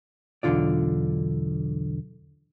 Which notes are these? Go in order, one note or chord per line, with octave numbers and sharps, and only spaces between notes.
B1 E2 G2 D3 F4 D5